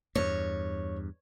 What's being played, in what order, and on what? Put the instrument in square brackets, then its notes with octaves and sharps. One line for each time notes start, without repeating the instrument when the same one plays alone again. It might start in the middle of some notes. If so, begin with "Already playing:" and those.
[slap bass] E2 G2 [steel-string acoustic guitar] C#5